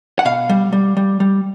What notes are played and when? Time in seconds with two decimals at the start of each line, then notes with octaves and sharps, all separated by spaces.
0.19 F#5
0.25 B2 F5
0.49 G3
0.73 G3
0.97 G3
1.20 G3